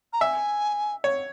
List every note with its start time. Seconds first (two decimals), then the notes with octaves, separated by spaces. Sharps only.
0.13 A#5
0.21 E5 G#5
1.04 C#5